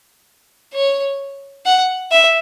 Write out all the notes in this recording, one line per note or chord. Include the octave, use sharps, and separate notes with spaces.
C#5
F#5
E5